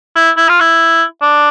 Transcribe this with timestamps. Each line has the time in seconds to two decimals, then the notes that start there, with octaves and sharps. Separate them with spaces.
0.15 E4
0.37 E4
0.49 F4
0.60 E4
1.22 D4